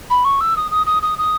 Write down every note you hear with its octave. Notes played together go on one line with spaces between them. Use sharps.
B5
C#6
E6
D#6
D#6
D#6
D#6
D#6